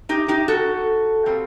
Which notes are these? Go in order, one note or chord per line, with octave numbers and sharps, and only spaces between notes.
D#4 G4
D#4 G4
F#4 A4
A#2 G3 C4